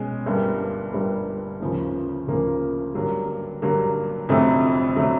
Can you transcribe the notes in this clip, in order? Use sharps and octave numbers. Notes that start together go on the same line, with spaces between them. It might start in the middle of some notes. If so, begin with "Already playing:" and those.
Already playing: B2 G#3 C#4
G1 G2 D3 G3 A#3
G1 G2 D3 G3 A#3
D2 C#3 F3 A#3
D2 C#3 F3 A#3
G2 D3 F#3 A#3
G2 D3 F#3 A#3
F1 F2 D3 F#3 A3
D3 F#3 A3